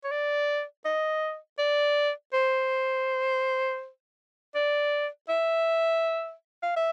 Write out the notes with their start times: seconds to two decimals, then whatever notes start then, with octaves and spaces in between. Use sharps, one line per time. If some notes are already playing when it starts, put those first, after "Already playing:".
0.04 C#5
0.11 D5
0.85 D#5
1.59 D5
2.33 C5
4.55 D5
5.29 E5
6.63 F5
6.76 E5